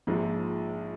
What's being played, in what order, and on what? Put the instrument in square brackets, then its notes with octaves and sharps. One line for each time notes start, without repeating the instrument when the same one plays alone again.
[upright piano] A#1 G#2 F3 G#3